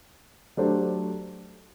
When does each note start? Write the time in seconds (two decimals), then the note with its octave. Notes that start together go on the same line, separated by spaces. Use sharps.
0.57 F#3 A3 D4 G4 C5